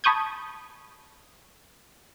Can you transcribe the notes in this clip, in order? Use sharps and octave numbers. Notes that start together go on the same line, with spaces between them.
A5 B5 C#6 D#6 G6 G#6